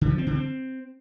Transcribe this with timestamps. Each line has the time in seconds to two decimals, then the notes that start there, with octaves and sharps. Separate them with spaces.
0.01 D3
0.10 F3
0.18 C4
0.27 D3
0.35 C4